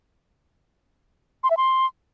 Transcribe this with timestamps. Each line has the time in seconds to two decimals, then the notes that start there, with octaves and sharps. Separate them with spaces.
1.44 C6
1.50 E5
1.57 C6